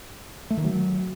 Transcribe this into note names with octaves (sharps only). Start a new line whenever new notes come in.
A3
D#3
F#3